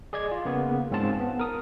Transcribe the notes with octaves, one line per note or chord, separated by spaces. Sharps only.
G#4 D5 D#5 G#6
F4
C#3 A#3 B3
G#2 C4 C#4 F4 A5
B3
A#4 D#6